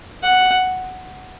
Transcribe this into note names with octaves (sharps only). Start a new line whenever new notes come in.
F#5